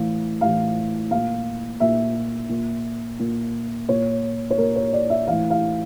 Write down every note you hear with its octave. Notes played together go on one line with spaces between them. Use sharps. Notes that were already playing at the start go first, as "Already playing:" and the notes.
Already playing: A2 E3 F5
A2 E3 F5
A#2 F5
A#2 E5
A#2
A#2
A#2 C#5
C#5
A#2 A#4
C#5
D5
E5
A2 E3 F5
F5